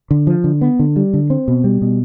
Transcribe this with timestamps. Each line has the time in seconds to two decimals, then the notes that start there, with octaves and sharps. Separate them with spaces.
0.11 D3
0.27 F3
0.44 D3
0.61 B3
0.79 D3
0.96 G3
1.14 D3
1.30 C4
1.48 B2
1.64 G3
1.82 B2